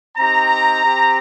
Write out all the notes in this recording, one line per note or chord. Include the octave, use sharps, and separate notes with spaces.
C4 D#4 G4 A#5
C4 G4